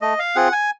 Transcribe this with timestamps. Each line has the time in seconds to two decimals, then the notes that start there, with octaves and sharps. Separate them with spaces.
0.01 A3 D#5
0.19 F5
0.35 C4 F4 G#4 F#5
0.52 G#5